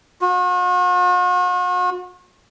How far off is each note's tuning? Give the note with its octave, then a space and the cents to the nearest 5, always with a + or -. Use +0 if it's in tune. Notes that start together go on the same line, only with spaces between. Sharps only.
F#4 -45